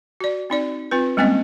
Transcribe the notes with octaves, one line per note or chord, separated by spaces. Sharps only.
F#4 D5
C4 D#4 D5
C4 F4 B4
G3 G#3 A#3 C4 C#4 D#5